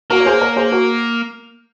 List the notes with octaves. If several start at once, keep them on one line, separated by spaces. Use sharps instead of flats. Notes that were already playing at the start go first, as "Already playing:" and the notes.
A#3 F#4 A#4
C#5
G#4 C5
A#4 C#5
G#4 C5
F#4 A#4